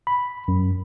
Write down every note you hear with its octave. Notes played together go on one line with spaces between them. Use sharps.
B5
F#2